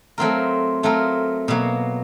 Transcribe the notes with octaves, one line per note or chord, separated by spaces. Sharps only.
F#3 A3 C4 F4 A#4
F#3 A3 C4 F4 A#4
B2 F#3 A#3